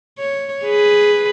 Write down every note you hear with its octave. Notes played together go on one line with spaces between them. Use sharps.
C#5
G#4 B4